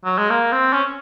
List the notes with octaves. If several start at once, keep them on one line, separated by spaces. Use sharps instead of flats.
F#3
G#3
A#3
C4
C#4